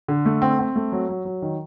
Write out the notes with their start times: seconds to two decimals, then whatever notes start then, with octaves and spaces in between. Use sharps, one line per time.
0.08 D3
0.25 A3
0.42 C4
0.59 C4
0.76 A3
0.92 F#3
1.09 F#3
1.25 F#3
1.42 D#3